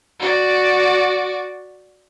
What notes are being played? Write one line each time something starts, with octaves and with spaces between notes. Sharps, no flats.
F#4 D5